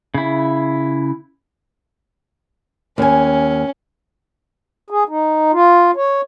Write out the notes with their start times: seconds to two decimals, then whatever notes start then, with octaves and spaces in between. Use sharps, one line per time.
0.14 C#3 E4
2.98 D#2 C#4 G#5
4.90 G#4
5.09 D#4
5.53 F4
5.96 C#5